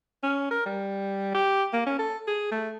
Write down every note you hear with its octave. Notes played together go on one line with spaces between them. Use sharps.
C#4
A#4
G3
G4
A#3
C#4
A4
G#4
A3